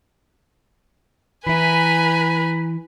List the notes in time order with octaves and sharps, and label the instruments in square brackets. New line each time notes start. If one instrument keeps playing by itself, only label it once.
[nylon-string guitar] E3 E4 [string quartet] B4 G#5 A#5 [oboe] B5